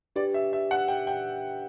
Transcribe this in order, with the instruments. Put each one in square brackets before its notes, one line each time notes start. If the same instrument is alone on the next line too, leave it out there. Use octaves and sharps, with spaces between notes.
[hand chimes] D4 G4 B4 [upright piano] D5
[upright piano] E5
E5
F#5
G5
G5